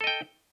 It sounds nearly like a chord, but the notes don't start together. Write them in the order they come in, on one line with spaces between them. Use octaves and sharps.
A4 D#5 G5